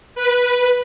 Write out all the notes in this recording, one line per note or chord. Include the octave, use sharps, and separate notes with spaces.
B4